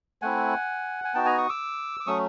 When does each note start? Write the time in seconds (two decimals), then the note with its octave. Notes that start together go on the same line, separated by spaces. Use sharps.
0.22 A3 C4 E4 F#5 G#5
1.04 G#5
1.14 B3 D#4 F#4 G5 A5
1.25 G#5 A#5
1.38 C#6 D#6
1.49 D6 E6
2.00 D6
2.07 F#3 A3 C#4 C#6 D#6